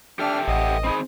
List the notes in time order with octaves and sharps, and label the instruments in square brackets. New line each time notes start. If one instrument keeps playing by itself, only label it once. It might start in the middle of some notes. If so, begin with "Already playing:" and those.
[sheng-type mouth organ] D4 F6 [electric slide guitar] G4 A4 E5 [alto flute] G5
[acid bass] A1 [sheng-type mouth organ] D#5 [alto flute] F#5
[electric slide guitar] C4 D#4 G#4 [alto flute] B5